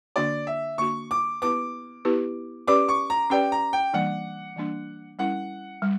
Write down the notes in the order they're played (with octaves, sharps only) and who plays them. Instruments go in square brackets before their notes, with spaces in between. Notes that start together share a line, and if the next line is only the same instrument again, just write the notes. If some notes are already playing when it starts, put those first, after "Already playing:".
[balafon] D3 A#3 D4 F#4 [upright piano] D5
[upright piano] E5
[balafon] D3 A#3 D4 F#4 [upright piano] C#6
[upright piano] D6
[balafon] B3 E4 G4 B4 [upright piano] D6
[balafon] B3 E4 G4 B4
[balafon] C#4 G4 B4 D5 [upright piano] D6
[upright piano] C#6
A#5
[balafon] C#4 G4 B4 D5 [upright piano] G5
[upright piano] A#5
G5
[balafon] E3 G3 A#3 D4 [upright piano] F#5
[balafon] E3 G3 A#3 D4
[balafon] G3 C#4 E4 A#4 [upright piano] F#5
[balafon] G3